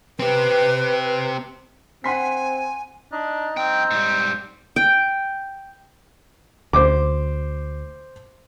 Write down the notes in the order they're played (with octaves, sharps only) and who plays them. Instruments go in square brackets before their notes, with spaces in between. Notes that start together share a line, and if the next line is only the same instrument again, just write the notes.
[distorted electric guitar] C4 G4 [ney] B4
[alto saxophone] C4 [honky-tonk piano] F#5 C6 B6 [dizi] G#5
[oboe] D4 [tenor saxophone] D#4
[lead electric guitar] G2 G5 [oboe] C4
[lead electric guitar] G#2 G3
[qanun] G5
[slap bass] D2 [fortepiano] C5 D6